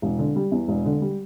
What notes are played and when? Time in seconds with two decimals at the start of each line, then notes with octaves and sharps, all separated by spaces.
0.02 E1
0.19 D3
0.36 G3
0.52 E2
0.68 E1
0.85 D3
1.01 G3